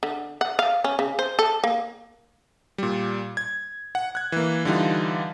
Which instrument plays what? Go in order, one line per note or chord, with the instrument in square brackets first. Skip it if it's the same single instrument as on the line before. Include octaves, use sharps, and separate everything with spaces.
[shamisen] D3
F#5
F5
C#4
C#3
C5
A4
A#3
[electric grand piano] A#2 G3
G#6
F#5
F#6 G#6
E3 A#3
D3 E3 G3 D#4 F4